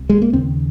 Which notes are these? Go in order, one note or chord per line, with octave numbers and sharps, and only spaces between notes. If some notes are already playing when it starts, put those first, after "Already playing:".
Already playing: C2 C3
G#3
A#3
D#2 C#3 C4